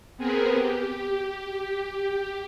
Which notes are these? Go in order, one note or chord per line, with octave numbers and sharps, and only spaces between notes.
B3 C4 G#4 A#4 B4
G4